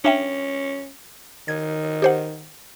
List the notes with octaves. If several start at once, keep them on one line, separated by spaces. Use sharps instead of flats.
C#4 D4 E5 G5
D#3 G#6
G4 C5 F#5